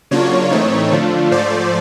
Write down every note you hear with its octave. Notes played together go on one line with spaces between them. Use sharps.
C#3 F#3 A#3 D4 F4 C#5
A2 E3 A3 C4 D#4 C#5
D3 F3 A3 D4 F4
G#2 F3 A3 C5 D5